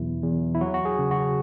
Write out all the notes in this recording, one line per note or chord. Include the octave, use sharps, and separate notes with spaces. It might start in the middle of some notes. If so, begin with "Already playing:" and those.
Already playing: E2 B2 F#3 E4
E2
E4
F#3 F#4
F#4
G#4
C#3
F#4